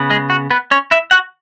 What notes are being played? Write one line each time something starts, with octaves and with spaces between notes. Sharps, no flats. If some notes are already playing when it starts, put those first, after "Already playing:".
Already playing: C#3 B3
G#3 G#4
F#4
B3 B4
C#4 C#5
E4 E5
F#4 F#5